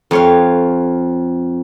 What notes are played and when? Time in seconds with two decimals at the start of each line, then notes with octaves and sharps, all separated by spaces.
0.11 F2 C#5 F5